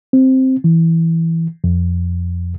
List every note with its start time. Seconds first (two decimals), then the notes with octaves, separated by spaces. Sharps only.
0.13 C4
0.64 E3
1.64 F2